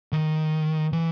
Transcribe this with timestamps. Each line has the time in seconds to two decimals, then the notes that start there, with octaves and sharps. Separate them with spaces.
0.12 D#3
0.93 E3